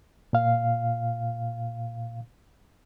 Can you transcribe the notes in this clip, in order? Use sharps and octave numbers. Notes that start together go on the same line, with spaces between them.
A#2 F5